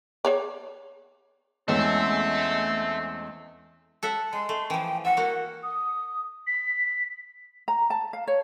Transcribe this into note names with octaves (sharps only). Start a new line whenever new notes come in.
G#4 C#5 D5
E2 G#3 A3 C4 C#4 A4 E5
A4 E5 F#5
G#3 C6
A3
E3 F3 G5
E5 F#5
A#3 F#4
D#6
B6
A#5
A5
F5
C#5